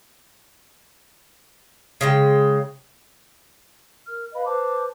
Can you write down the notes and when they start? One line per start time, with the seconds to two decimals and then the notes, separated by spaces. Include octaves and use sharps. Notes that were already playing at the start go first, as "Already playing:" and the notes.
2.01 C#3 G#3 G5
4.07 A#4 F6
4.33 B4 D#5 F5 B5
4.46 B4 C5 A5 D6